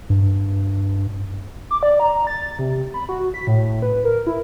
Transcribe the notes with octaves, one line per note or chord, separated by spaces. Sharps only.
G2
D6
D5
A#5
A6
C3
B5
F#4
B6
A2
B4
A#4
E4